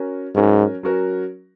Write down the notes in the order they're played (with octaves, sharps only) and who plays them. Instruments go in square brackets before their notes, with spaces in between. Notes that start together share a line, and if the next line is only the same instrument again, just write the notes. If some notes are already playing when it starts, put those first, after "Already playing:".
Already playing: [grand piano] C#4 F#4 A#4
[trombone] G#2 [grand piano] F#3 C#4 F#4 A#4
[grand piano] F#3 C#4 F#4 A#4